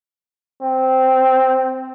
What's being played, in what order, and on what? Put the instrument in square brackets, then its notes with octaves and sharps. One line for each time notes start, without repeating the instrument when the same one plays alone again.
[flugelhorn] C4